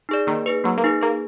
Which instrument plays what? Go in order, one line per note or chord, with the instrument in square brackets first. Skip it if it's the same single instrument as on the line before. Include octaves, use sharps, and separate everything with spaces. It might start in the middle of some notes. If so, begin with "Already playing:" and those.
[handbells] D#4 G#4 D5
[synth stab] D#3 [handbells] A#3
[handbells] D#4 G#4 B4
[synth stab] F#3 [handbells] A#3
[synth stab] A#3
[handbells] D#4 G#4 B4
[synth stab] A#3 [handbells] G#4